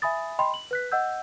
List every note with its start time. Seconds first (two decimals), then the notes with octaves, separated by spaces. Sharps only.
0.02 E5 G#5 B5 D#6 A6
0.39 D#5 G5 B5 C6
0.54 F#7
0.71 B4 F#6 B6
0.92 D#5 F#5 E6 G6